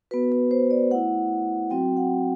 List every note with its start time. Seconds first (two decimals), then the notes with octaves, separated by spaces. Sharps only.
0.11 B3 F#4 B4
0.32 B4
0.51 C5
0.71 D5
0.90 A3 E4 F#5
1.70 F#3 C4 F#4 G5
1.97 F#5